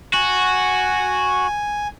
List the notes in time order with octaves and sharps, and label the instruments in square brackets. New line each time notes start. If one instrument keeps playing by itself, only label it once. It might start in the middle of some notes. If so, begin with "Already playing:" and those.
[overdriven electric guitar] F#4 [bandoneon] G#5